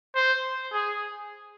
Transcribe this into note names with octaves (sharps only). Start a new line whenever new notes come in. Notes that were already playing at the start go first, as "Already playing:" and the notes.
C5
G#4